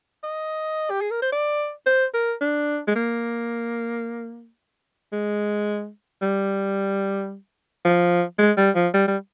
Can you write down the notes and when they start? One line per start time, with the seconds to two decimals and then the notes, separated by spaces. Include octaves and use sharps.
0.23 D#5
0.90 G4
1.01 G#4
1.11 A#4
1.22 C5
1.32 D5
1.86 C5
2.14 A#4
2.41 D4
2.88 G#3
2.96 A#3
5.13 G#3
6.22 G3
7.85 F3
8.39 G#3
8.57 G3
8.76 F3
8.94 G3
9.08 G3